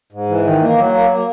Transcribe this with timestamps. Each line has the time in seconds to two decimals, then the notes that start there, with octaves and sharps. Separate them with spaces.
0.13 G#2
0.29 E3
0.45 D#3
0.62 A#3
0.78 F#3
0.94 A#3
1.10 A#3